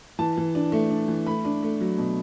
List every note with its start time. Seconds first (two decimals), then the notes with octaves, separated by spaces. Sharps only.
0.19 E3 A5
0.37 E3
0.55 D4
0.72 A3
0.90 D4
1.08 E3
1.27 A3 B5
1.45 D4
1.63 A3
1.81 F#3
1.98 B2